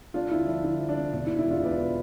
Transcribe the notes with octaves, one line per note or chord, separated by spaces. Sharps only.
C3 D4 F4
D2 E4
F3 D4
D2 E4
F3
D4
C3
E1 D4
E4
B2
E4
E2 D4 F4
E1 B4 D5